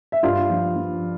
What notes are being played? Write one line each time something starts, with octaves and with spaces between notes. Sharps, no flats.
E5
G2 F4 F5
F3
F3